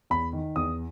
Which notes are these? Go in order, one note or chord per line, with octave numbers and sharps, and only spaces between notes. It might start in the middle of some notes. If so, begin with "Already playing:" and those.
E2 B5
D#3
E2 D#6